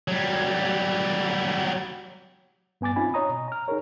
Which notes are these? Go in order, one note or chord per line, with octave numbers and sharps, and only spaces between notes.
F#3 G3
G2 B3 G#5 D6 A6
C4 C#4 D#4 F4 G#5 B5
C#5 D#5 A#5 D#6
B2
A#5 F6
D#4 G#4 A#4 C#5